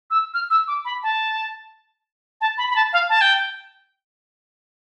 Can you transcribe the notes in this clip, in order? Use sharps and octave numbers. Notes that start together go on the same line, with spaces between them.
E6
F6
E6
D6
B5
A5
A5
B5
B5
A5
F5
A5
G5